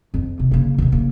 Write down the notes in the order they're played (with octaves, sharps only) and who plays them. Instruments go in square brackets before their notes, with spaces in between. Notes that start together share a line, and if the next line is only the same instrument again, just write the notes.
[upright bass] F2
C3
C#3 A#3
D2 C3
C#3 A#3